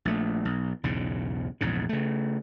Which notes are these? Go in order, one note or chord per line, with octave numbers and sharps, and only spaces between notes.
A#1 A3
B1
B1 E2 G#2 C#3
A#1 E2 G#2 C#3
C#3 A3